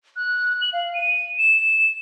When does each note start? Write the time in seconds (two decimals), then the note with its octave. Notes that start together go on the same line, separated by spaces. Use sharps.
0.16 F#6
0.61 F#7
0.73 F5
0.94 D#7
1.38 E7